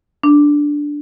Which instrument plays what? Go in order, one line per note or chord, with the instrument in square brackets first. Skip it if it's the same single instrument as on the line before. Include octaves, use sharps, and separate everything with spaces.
[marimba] D4